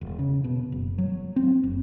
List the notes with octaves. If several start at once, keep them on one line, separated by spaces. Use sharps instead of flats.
E1
C#3
B2
F#1
F#3
C4
F#1